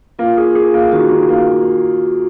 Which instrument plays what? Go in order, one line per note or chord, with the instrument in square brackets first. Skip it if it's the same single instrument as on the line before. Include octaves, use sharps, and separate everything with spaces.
[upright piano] A#3 [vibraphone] F4
[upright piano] G#4
G#4
A#3
[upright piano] D#3 [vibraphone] F#4
[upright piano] D#3
A#3